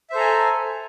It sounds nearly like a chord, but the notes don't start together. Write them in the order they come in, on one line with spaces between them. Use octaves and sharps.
E5 C5 A4 A#5 G#5